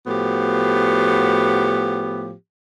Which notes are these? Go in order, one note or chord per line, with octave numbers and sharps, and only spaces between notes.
A2 F3 B3 F#4 G4